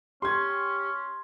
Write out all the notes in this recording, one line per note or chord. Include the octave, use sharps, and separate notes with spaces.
C#4 G4 C6 G#6